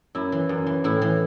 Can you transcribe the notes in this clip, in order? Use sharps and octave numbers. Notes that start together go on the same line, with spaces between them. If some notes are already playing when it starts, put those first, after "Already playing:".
F#2 E4
E3
F#2
E3
A2 E4
E3